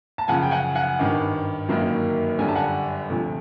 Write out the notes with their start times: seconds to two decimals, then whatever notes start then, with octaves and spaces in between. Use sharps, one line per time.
0.18 A5
0.28 F#2 C#3 F3 F#5 G#5
0.43 G5
0.51 F#5 G#5
0.75 F#5 G#5
0.99 G#1 G2 D#3
1.69 G1 F#2 D#3 F#3 A#3
2.39 G1 F#2 D3 G3 G#5
2.48 A5
2.55 F#5 G#5
3.10 D2 C3 F3 A3